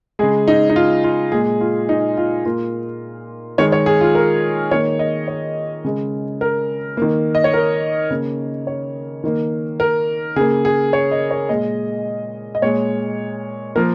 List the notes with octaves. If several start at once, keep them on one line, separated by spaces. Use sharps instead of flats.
C#3 G#3 G#4
D#4
D#4
F4
F4
A#2 G#3 G#4
F4
D#4
F4
A#2 A#3 F4
D#3 G#3 C#5
C#5
G#4
F4
A#4
D#3 A#3 C#5
D#5
C#5
C#3 G#3
A#4
D#3 A#3
D#5
C#5
A#4
C#3 A#3
C#5
D#3 A#3
A#4
C#3 A#3 G#4
G#4
C#5
D#5
C#5
A#2 G#3 D#5
D#5
A#2 G#3 C#5
F3 A#3 A#4